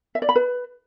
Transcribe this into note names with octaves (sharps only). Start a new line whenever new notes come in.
E5
D5
B5
B4